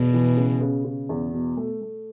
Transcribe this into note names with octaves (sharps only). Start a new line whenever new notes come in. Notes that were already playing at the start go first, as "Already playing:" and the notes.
Already playing: E2 B2
E3
C#3
C#3
C#3
E2
B2
A3
A3